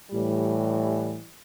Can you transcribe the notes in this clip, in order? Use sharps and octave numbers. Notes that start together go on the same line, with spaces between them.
A2 E3 G3